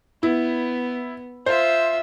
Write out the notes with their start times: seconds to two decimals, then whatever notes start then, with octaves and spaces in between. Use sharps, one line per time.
0.23 B3 E4
1.46 F4 C5 E5